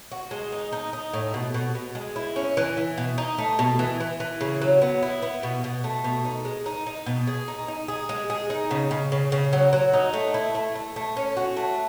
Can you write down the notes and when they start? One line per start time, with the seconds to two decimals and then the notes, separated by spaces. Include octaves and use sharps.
0.12 F#4
0.31 G#3
0.52 D#4
0.73 D#4
0.93 D#4
1.14 A2
1.34 B2
1.54 B2
1.75 B2
1.95 G#3
2.16 E4
2.36 C#4
2.57 E3
2.77 E3
2.98 B2
3.18 D#4
3.38 A3
3.59 B2
3.79 E3
4.00 E3
4.20 E3
4.41 C#3
4.61 F#3
4.82 B3
5.03 E4
5.22 B3
5.43 B2
5.64 B2
5.84 A3
6.04 B2
6.25 D#4
6.45 G#3
6.66 D#4
6.87 D#4
7.06 B2
7.27 G#4
7.48 D#4
7.68 D#4
7.88 G#4
8.09 G#3
8.30 G#4
8.50 D#4
8.71 C#3
8.91 C#3
9.12 C#3
9.32 C#3
9.53 F#3
9.73 F#3
9.93 D#4
10.14 A3
10.34 E4
10.55 A3
10.75 A3
10.96 A3
11.17 C#4
11.37 F#4
11.57 A3